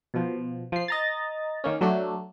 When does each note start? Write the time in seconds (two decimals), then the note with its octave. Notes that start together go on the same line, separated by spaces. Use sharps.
0.14 B2 F3
0.72 F3 C7
0.88 D#5 A#5 A6
1.64 D#3 A#3 C#4
1.81 F#3 A3 D4